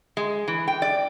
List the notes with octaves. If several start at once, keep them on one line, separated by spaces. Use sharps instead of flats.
G#3
E3
G5
D5